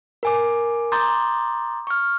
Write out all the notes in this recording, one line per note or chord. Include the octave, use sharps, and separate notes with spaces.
A#4 G#5 D6
A#5 C6 D6 D#6 G6 A6
C#6 F6